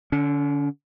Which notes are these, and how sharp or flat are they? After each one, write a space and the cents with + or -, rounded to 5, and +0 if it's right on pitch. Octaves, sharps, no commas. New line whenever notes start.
D3 +0 C#4 +45